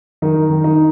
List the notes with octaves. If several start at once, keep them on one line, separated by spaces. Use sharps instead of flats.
D#3 D#4
D#3
D#4